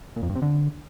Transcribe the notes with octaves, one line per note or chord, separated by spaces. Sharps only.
A#2
F2
G2
C3
D3